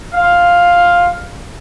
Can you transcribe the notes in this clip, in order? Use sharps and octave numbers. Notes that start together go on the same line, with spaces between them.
F4 F5